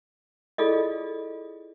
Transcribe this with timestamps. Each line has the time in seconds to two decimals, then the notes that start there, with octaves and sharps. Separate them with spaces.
0.58 E4 F4 G#4 A4 D5 D#5